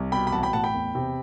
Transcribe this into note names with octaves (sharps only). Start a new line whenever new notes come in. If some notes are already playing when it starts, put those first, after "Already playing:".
Already playing: C2
B2 G5 B5
B5
A1 F#5 A5
G5 B5
A2 F#5 A5
G5 B5
E2
C3